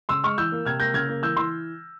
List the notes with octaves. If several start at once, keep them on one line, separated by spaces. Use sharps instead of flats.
C#3 C6 E6
G#3 C#6 F6
E3 E6 G6
A#3
C3 F6 G#6
A#3 G6 A#6
C#3 F6 G#6
A#3
E3 E6 G6
E3 C6 E6